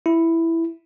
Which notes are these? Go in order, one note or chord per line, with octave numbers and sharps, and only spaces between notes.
E4